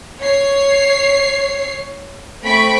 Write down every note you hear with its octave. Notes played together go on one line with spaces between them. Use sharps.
C#5 C7
A3 C4 B5 C#6 B6 D7